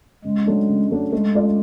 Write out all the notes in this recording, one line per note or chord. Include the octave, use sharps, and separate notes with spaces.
C#3 G#3
F#3 A3 D4
C#3
F#3 A3 D4
G#3 A3
C#4 F4 A4 D5